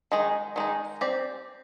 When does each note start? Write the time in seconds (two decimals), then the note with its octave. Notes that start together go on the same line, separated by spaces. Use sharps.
0.12 D#3 G#3 D#4
0.56 D#3 G#3 D#4
1.01 C4 G4 D5